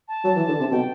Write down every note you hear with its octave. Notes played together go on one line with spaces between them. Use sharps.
A5
F#3
E3
D3
C3
B2 G5